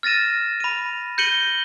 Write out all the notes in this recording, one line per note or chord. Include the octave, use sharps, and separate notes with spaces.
F6 A6 A#6 D#7 E7
B5 D#7
G6 A#6 C#7 D#7 F#7 G7